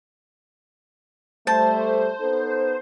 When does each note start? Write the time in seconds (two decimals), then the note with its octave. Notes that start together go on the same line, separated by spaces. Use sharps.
1.47 G3 A3 C5 A5
2.20 B3 D#4 A4